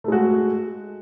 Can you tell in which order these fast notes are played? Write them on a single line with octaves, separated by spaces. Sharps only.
A3 G#3 F#4